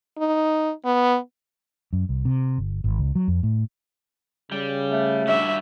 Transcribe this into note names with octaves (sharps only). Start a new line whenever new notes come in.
D#4
B3
F#2
C2
C3
G1
G#1
C#2
F#3
F2
A2
C#3 G3
A3
G2 G3 F#4 E5